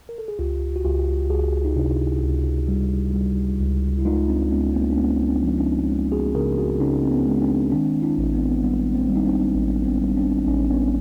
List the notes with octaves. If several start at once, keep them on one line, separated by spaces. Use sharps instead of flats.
A#4
A4
G#4
C#2 F4 G4
F#4
C#2 F4 G4
C#2 F#4 G#4
D#4
C3 D4 E4
C#2
G3
G3
C#2
E4
G#3 D#4 F4
C4 D4
G#3 B3 C#4
A#3 C4
D4
G#3 B3 C#4
C4 D4
F3
C#4 D#4
G#3
F#4 G#4
C#3 G#4 A#4
F#4 G#4
C#3 C#4 D#4
C4
B3 C#4
G#3
C4 D4
D#3 C4 D4
D4 E4
A1
B3
C4
B3
G3 B3
A#3 C4
G3
D#4
C4 D4
A1
B3 C#4
G3
C4 D4
A1 C#4 D#4
B3 C#4